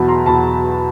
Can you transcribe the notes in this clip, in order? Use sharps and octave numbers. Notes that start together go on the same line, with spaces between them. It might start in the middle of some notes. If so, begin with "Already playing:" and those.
Already playing: E2 B2 F#3 A5 B5
A#5 C6
E2 B2 F#3 A5 B5